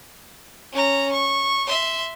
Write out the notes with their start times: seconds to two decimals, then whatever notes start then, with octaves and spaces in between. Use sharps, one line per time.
0.72 C#4 A#5
1.12 C#6
1.67 E5 C6